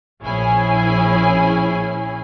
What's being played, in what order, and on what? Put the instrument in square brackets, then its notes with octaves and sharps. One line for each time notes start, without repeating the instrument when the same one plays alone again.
[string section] A#1 C#4 E4 G#4 G#5